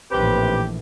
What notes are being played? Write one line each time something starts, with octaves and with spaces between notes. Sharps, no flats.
A#1 A2 D#3 E3 C4 G4 B4